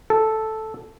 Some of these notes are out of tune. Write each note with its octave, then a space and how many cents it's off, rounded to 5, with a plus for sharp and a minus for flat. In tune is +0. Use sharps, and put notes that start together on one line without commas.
A4 -5